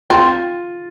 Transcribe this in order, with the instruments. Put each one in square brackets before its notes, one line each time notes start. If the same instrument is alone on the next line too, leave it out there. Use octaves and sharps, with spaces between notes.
[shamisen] C4 [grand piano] F4